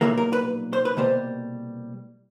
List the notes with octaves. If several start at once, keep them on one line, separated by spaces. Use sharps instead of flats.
B1 A#2 G3 A#3 E4
A#4
B4
C5
B4
C2 B2 G3 A#3 C5